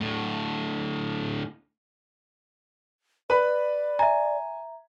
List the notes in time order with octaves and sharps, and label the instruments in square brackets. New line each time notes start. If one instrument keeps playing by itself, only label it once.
[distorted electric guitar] D2 A2
[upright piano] B4 B5 [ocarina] D5
[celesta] E5 A#5 [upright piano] G#5